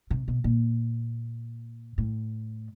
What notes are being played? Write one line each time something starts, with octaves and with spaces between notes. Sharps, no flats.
C3
B2
A#2
A2